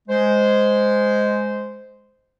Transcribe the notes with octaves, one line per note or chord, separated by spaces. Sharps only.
G#3 C5